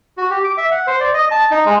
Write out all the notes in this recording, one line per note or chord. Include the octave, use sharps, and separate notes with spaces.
F#4
G4
D6
E5
F#5
C5
D5
D#5
A5
D#4
G#3